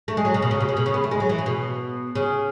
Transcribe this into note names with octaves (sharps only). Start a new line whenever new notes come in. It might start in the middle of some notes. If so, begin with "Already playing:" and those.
A3
G#3
F#3
C#3
B2
C#3
B2
C#3
B2
C#3
B3
A3
G#3
F#3
E3
C#3
B2
C#3